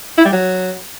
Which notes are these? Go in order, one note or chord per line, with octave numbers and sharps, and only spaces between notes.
E4
G3
F#3